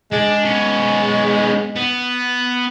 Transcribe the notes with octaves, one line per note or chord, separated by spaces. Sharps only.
G#3 D4
B3 C#4
B3